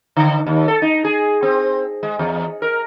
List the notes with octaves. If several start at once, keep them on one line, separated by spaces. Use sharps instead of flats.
D3
D#2
A4
D#4
G#4
C4
G#3
E2
A#4